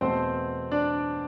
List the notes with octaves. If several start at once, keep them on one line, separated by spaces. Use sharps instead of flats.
E2 B2 A3 C4 C5
D4 D5